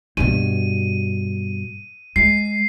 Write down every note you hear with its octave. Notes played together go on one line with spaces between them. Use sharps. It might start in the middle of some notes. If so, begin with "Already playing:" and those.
G2 B2 D#7
G#3 C7